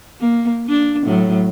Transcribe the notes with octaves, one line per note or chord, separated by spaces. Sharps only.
A#3
A#3 D4
A2 F#3